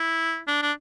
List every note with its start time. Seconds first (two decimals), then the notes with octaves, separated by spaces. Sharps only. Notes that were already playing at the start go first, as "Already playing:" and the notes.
Already playing: E4
0.48 D4
0.62 D4